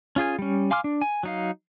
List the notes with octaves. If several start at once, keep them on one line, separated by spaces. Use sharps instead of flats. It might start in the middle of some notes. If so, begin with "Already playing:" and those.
C#4 F4 G#4 G#5
G3 C#4
F5 G#5 C6 D6 F6
D4
G#5
F#3 D#4 F5